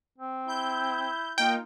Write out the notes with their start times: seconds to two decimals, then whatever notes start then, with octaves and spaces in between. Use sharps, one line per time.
0.18 C4
0.48 E4 G6
1.38 A#3 D#4 F4 G5